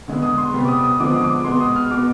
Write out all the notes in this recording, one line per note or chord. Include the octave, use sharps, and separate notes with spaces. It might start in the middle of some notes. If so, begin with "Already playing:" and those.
D3 G#3 B3
D#6
C6
C3 G3 B3
D6
D#6
D#6
D3 F3 G#3 B3 D6
D#6
D6
B2 G#3 B3 C6
D#6
F6
B2 B3 D6